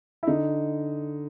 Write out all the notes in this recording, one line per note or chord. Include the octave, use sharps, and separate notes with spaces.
E4
D3 D#4